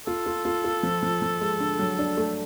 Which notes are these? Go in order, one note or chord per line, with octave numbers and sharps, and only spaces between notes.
F4 A4
F4
F4
F4
F3
F3
F3
G#3
D3
F#3
D4
A3